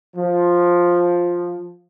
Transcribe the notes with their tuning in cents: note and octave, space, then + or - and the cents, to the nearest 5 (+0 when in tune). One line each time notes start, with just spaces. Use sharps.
F3 +5